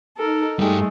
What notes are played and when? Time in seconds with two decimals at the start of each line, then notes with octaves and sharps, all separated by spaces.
0.17 D#4 A4 A#4
0.59 G2 G#3 A3 G4